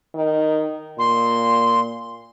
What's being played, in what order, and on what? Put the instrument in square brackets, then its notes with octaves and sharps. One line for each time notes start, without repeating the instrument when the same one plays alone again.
[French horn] D#3
[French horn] A#2 [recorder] C6